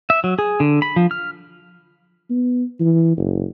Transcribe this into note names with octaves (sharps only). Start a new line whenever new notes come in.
E5
F#3
G#4
D3
B5
F3
F6
B3
E3
F#1